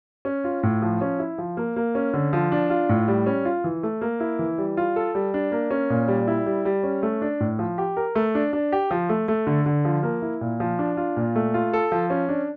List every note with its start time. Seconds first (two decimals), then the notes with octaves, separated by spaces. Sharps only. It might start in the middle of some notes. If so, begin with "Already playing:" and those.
0.25 C#4
0.44 F4
0.63 A2
0.82 F3
1.01 C#4
1.19 E4
1.38 F3
1.57 A#3
1.76 A#3
1.95 C#4
2.13 D3
2.33 F3
2.52 D4
2.70 F4
2.89 A2
3.08 G3
3.26 C#4
3.45 F4
3.64 E3
3.83 A3
4.01 A#3
4.20 E4
4.39 E3
4.58 G3
4.77 F4
4.96 A4
5.15 G3
5.34 D4
5.52 A#3
5.71 C#4
5.90 A#2
6.08 G3
6.28 E4
6.46 G3
6.65 G3
6.83 C#4
7.03 A3
7.22 D4
7.40 A2
7.59 F3
7.78 G4
7.97 A#4
8.15 A3
8.35 D4
8.53 D4
8.72 G4
8.91 F3
9.09 A3
9.28 A3
9.47 D3
9.66 D3
9.85 F3
10.03 A#3
10.22 E4
10.41 A#2
10.60 F3
10.79 D4
10.97 F4
11.17 A#2
11.36 A3
11.54 F4
11.73 A4
11.92 F3
12.10 C#4
12.29 D4